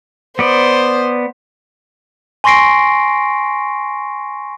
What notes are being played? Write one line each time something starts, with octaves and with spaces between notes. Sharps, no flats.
B3 C5 D5
G#5 C6 C#6 A#6 C7 D7